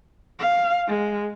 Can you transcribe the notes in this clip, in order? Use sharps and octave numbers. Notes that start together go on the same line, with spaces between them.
F5
G#3